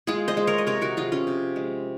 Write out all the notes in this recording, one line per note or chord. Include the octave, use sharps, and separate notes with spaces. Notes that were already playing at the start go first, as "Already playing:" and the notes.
G#3 F4 G#4
C5 D#5
G#3
A#4 C#5
D#5
C3 A#4 C#5
F#4 A#4
F3 F4 G#4
C#4 F4
C3
G#3